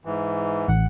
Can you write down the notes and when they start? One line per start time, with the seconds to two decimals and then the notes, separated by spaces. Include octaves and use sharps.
0.05 G#2 E3
0.68 A1 F#5